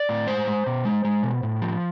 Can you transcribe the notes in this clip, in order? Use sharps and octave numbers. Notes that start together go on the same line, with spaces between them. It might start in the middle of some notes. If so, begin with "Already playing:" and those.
Already playing: D5
A2
G#3 C5
G#3
B2
G#3
G#3
B2
A2
F3